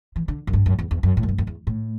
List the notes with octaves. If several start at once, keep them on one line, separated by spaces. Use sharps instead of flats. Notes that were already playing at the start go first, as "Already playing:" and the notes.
E3
D3
F#2
G2
F#2
E2
E2
F#2
A2
F#2
G2
F#2
E2
A2